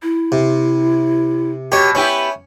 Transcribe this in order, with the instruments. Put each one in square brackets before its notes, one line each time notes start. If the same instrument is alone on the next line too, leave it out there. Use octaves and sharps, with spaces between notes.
[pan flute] E4
[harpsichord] C3
[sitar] B2 [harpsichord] G4 C#5
[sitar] B3 E4 G4 [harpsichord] C#4